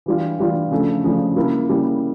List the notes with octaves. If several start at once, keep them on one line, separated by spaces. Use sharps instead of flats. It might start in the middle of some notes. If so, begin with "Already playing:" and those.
E3 G3 D4 F4
E3 G3 D4 F4
C#3 F3 A3 D4
C#3 F3 A3 D4
C#3 G3 A#3 E4
C#3 G3 A#3 E4